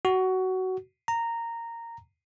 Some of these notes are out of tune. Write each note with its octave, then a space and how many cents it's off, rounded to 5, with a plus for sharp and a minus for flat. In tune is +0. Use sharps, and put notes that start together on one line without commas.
F#4 +15
A#5 -10